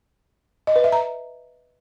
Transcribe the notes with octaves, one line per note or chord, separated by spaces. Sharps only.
D#5
B4
E5
A#5